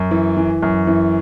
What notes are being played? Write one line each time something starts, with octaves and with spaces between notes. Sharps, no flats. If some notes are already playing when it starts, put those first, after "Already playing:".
Already playing: F#2
E3
E3
F#2
E3